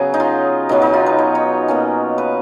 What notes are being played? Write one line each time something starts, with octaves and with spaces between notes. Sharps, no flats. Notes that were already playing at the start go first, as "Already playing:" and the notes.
Already playing: C#3 F#3 B3 G#4
D#4
F4
B2 F#3 B3 D#4
D#4
F4
B4
C#5
C#5
B2 A#3 C#4
B4